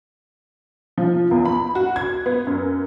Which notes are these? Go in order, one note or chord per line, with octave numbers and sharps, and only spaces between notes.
F3
E2
B5
F#4
G#6
B3
F#2